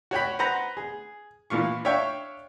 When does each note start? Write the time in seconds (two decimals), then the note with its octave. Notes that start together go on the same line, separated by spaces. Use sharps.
0.11 F#4 C#5 G5 B5
0.39 B4 C5 F#5 A#5
0.77 G#4
1.50 A#2 E3 F4 C#6
1.85 D4 C#5 E5 F5 G5 C#6